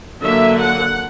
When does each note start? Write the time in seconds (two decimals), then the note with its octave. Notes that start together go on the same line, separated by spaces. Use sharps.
0.20 D3 F#3 A#3 E5
0.57 F#5